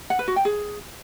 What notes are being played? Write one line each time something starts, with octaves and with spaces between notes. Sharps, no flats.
F#5
B4
F#4
G5
G#4